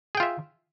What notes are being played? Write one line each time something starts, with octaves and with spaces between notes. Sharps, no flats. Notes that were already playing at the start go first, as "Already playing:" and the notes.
F4 G#4 E5 G5